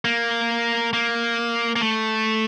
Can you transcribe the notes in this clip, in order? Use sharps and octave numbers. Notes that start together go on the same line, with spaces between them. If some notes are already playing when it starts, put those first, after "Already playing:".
A#3
A#3
A#3
A3